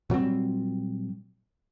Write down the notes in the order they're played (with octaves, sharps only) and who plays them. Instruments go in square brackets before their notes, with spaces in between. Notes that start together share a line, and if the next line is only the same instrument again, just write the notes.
[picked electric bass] A#2 F#3 G3 C4